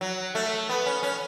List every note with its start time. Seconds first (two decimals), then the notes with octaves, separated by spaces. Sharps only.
0.01 F#3
0.35 A3
0.69 B3
0.86 C#4
1.03 C#4